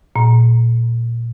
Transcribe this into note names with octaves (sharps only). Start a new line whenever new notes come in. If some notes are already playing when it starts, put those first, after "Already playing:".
A#2